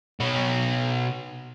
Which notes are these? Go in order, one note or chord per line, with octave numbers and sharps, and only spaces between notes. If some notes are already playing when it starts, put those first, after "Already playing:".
B2 C#5